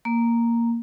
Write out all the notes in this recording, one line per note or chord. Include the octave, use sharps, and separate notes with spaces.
A#3